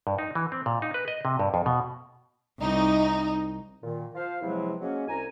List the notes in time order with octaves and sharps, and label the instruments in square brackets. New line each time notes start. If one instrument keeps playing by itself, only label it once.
[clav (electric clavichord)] G2
D#4
E3
C4
A#2
D#4
B4
D#5
C3
G2
F2
B2
[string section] C2 D#4
[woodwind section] A#2 D#3
F3 C5 F5
E2 C3 F3 F#3 G#3 E4
F#3 G#3 A#3 C#4
C2 G#5 A#5